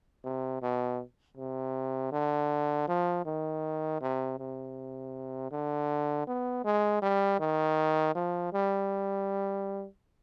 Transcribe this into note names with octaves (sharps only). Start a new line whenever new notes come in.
C3
B2
C3
D3
F3
D#3
C3
C3
D3
B3
G#3
G3
D#3
F3
G3